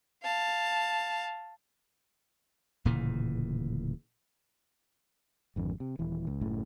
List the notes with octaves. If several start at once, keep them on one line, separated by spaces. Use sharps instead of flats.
F5 A5
D1 A#2 C#3 E3
G#1 F2 D3
C3
D#1 E3
C#2
F#1 A2 C#3